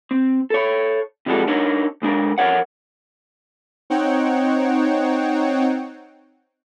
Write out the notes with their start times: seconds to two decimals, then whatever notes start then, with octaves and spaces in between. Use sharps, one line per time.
0.11 C4
0.50 A4 C#5
1.26 C3 F3 G3 G#3 F#4 A4
1.48 D4 D#4 A#4 C#5
2.02 B1 G#3 D4 A#4
2.38 F2 F3 A#4 C#5 F#5
3.90 C4 D#4 C#5 F#5 G5